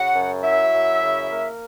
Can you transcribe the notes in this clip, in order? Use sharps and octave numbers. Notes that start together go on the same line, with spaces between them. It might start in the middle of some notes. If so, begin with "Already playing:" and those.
Already playing: C#3 F#4 F#5
F#2
F#3 E4 E5
F#2
C#3
A#3